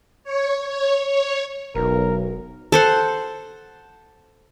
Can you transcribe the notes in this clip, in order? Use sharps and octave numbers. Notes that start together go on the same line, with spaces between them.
C#5
C#5
C#5
E1 B1 A#4
A4 C5 F#5